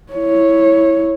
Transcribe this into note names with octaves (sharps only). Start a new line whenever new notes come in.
E4 C#5